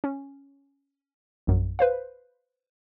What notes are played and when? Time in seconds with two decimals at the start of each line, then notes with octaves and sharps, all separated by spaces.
0.04 C#4
1.47 A#1 F#2
1.79 B4 C5 F5